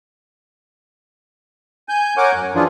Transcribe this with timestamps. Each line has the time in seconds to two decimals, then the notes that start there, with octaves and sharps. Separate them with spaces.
1.89 G#5 G6
2.17 A#4 C#5 F#5 G#5 C#6 D6
2.34 F#2
2.55 E3 F3 D4 F4 G#4